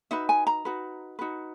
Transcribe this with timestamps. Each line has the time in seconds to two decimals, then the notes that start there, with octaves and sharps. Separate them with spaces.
0.11 D#4 F#4 B4 E5
0.29 G#5
0.47 A#5
0.65 D#4 F#4 B4
1.19 D#4 F#4 B4